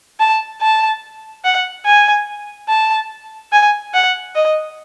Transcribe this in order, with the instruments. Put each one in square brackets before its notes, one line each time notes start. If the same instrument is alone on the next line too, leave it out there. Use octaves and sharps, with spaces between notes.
[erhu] A5
A5
F#5
G#5
A5
G#5
F#5
D#5